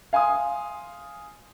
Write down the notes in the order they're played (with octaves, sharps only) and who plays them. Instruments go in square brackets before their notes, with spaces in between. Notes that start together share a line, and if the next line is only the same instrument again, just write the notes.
[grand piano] F5 G#5 C6 D#6